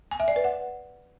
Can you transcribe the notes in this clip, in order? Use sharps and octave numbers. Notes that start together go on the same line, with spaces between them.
G#5
E5
D5
B4
F#5